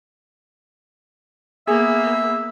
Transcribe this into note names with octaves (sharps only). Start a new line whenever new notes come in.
A#3 B3 G#4 E5